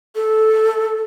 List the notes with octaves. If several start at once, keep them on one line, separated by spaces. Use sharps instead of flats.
A4